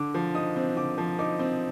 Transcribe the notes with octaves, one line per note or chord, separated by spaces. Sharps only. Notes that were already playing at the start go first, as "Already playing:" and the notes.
Already playing: D3 D6
F3
D#4 D#6
C4
D3 D6
F3
D#4 D6
C4